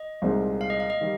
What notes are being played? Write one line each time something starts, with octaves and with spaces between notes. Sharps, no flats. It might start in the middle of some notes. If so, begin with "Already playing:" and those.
Already playing: D#5
C2 A#2 G#3 C4 D#4
F5
D#5
F5
D#5
D#3 G3